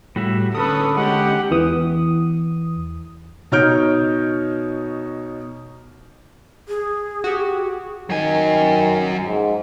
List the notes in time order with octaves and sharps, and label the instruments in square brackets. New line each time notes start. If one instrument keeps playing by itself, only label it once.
[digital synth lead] A2 [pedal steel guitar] G3 F#4 E5
[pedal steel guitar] D3 C#4 [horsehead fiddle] A4 B4 [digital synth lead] D#6
[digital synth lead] G#3 [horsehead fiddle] G4 F#5
[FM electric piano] E2 E3 D#6
[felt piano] B2 D#4 C#5 F6 G6 D7
[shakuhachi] G#4
[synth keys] F#4 G4
[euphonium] D#3 [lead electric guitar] F#3 G#5
[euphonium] G#2